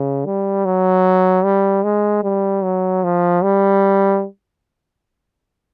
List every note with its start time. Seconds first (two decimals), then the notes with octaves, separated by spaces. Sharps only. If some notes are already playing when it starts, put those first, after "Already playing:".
Already playing: C#3
0.26 G3
0.65 F#3
1.44 G3
1.84 G#3
2.24 G3
2.64 F#3
3.04 F3
3.43 G3